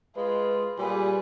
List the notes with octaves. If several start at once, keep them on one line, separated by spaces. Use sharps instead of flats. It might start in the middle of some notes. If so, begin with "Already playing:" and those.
G#3 F4 B4
A#2 G3 G#4 B4